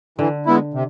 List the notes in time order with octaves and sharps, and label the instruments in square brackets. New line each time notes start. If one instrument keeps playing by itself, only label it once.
[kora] D3 [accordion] E3
[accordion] G#3 B3 E4
C3